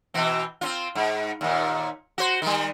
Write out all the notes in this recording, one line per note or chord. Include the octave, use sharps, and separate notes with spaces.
B2 E3 C4
C4 C#4 F4
G#2
D#2 A#2
F#4 C5
D#3 G3